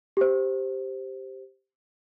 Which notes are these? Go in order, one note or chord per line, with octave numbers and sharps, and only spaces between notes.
G4 C5